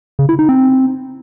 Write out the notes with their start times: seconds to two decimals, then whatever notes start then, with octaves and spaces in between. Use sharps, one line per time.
0.19 C#3
0.29 E4
0.39 D#4
0.49 C4